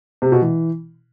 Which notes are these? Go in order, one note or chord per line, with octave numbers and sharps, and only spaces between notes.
C3
B2
E3